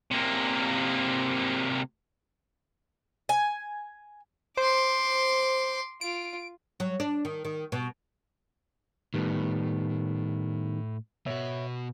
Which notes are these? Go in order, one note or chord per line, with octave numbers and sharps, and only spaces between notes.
C3 A#3
G#5
C5 C6 D6
F4 D7
F#3
D4
D#3
D#3
B2
A2 D#3 G3 B3
B2 F#4 C#5 E5